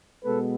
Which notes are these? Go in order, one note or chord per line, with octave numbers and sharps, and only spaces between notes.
B2 G#3 B3 A4 B4